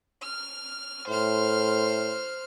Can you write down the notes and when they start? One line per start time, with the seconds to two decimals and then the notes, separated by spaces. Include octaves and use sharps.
0.23 F6
1.09 A2 C5 F6